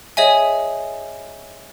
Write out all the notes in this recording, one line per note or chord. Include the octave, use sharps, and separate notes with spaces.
G#4 C#5 D#5 E5 G#5